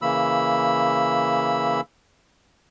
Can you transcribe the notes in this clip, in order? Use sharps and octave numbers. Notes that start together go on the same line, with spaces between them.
C#3 E3 A#3 B5 E6